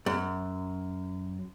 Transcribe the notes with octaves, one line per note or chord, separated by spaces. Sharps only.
F#2